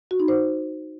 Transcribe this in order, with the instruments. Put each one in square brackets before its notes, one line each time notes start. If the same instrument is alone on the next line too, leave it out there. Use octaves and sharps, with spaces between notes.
[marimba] F#4
D#4
C5